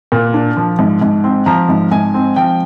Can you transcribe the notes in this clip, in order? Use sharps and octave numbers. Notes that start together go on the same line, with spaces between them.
A#2
D4
F3
G#2
G#2
C4
F3 A#5
G#2
G#2 G#5
C4
F3 G5